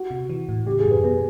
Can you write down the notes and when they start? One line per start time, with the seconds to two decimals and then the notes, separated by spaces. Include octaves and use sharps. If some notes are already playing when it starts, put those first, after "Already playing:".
Already playing: F#4
0.10 C3
0.30 E3
0.49 A2
0.66 C#3 G4
0.79 G#4
0.85 F#2
0.91 B4
1.03 B2 B4